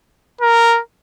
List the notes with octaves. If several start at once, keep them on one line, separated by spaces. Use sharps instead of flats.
A#4